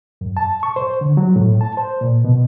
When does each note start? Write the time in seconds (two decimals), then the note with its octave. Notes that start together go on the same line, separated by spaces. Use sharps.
0.21 F#2
0.37 A5
0.63 C#6
0.76 C5
1.01 D3
1.17 F#3
1.36 A2
1.61 A5
1.77 C5
2.01 A#2
2.24 B2